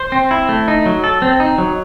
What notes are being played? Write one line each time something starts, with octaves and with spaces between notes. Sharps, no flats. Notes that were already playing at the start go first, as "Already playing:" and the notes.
Already playing: C5
C4
E4
A3
D#4
F#3
A4
C4
D#4
F#3